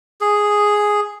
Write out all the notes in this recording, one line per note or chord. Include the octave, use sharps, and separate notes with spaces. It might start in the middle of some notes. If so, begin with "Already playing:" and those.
G#4